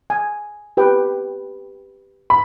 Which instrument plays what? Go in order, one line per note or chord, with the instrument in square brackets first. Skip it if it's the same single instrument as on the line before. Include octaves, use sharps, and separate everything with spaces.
[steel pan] G#5
G4 B4 G5
[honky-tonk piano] B5